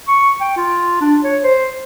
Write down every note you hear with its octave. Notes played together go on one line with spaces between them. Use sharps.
C#6
G5
F4
D4
C#5
C5